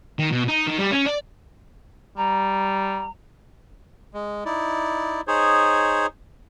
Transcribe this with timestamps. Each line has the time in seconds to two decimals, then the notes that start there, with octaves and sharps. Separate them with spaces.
0.19 D#3
0.31 B2
0.48 D#4
0.67 D#3
0.78 G3
0.91 C#4
1.06 D5
2.17 G3 A#5
4.14 G#3
4.45 D#4 E4 D5
5.27 D#4 G#4 C5 C#5